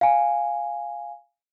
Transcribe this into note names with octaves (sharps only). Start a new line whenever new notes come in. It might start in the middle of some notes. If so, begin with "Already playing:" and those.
F5 G#5